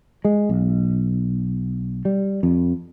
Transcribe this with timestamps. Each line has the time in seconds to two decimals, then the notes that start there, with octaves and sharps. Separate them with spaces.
0.25 G#3
0.49 B1
2.05 G3
2.43 F2